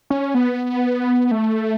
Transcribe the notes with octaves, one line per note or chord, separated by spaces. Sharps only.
C#4
B3
A3